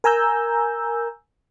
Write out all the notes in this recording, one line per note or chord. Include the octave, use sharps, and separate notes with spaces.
A#4 G#5 A#5 E6 G6